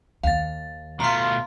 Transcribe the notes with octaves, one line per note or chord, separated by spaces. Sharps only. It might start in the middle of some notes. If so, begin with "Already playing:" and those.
D#2 F5 A6
B2 A3 F4 A#5 C6